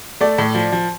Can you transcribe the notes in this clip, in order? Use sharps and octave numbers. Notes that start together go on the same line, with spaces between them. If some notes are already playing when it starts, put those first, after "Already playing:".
A3 D5
A2
F3
F3